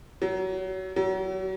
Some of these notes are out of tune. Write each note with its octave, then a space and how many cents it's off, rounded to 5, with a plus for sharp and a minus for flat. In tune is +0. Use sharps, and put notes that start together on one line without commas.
F#3 +25
F#3 +35